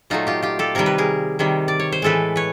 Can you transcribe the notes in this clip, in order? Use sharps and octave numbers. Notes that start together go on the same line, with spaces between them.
A#2 F#3 A3 D#4 F4
F4 G4
F4 G4
G4 A4
C3 D#3 G3 A#4
B4
G#4 A#4
C3 D#3 G3
D5
C#5
C5
A2 E3 G#3 A4 B4
B4 C#5